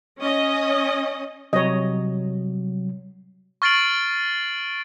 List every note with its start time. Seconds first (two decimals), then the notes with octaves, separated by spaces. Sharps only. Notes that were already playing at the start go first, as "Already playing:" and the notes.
0.19 C#4 D#5
1.53 C3 F#3 G3 C#5 D#5
3.62 C#6 F6 A6 C7 D7 F#7